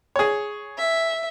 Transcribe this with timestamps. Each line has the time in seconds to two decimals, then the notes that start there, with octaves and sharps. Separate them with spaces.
0.16 G#4 C#5
0.78 E5